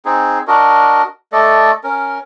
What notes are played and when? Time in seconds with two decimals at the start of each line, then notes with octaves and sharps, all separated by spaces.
0.05 C4 D#4 G#4
0.48 D4 F#4 A#4 D#5
1.32 A3 A4 D5 D#5
1.84 C#4 A#4